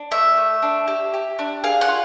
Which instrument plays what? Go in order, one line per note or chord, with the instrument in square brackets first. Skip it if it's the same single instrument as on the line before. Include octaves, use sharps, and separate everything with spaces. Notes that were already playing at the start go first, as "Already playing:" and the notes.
Already playing: [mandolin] D4
A3 E5
A3
D4
G4
G4
D4
G#4 F5
F#5
F4